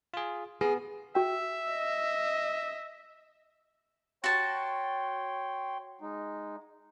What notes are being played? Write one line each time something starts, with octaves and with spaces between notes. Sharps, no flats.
F4 G#4
B3 G#4
F#4 E5 G5
D#5
F#4 C#5 G5 A5 C6
G#3 D#4